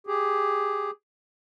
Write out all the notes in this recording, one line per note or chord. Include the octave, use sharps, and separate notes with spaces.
G4 G#4